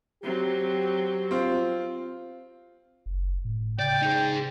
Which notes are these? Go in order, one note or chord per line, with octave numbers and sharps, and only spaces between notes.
F#3 C4 G4
C4 F4
F#1
A2
C#3 D5 G5
D#4 G#4